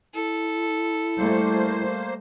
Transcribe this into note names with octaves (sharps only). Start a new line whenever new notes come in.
E4 A4
G3 A3 A#3 C5